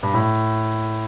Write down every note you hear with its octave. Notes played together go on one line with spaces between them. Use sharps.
G2
A2